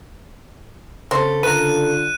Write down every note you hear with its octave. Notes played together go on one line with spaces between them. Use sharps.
C#3 C4 A4 C5
D3 F4 A#4 B4 F#6 D#7